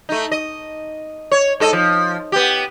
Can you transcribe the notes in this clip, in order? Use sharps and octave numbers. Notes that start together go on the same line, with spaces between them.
A3 D#4
D#5
C#5
G#2 A4 D#5
F3
B3 G4